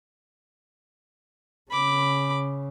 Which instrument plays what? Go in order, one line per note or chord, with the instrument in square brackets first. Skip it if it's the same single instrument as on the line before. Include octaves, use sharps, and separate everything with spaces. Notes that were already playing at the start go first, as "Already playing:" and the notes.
[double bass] C#3 [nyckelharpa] B5 D6